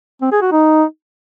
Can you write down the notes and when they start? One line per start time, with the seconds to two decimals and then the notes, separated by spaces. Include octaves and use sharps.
0.22 C4
0.32 G#4
0.42 F#4
0.52 D#4